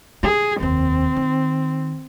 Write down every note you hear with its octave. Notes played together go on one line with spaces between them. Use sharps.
D3 G#4
F1 D#2 C4
D#3